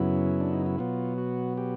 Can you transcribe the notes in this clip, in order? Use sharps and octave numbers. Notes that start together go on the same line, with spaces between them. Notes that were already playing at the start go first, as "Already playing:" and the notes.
Already playing: F#2 C#3 F#3 B3 E4
D4
D#4
E4
B2 F#3 B3 F4
F#4
G4